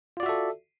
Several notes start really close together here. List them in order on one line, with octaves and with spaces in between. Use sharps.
F4 D5 F#4 E5 A4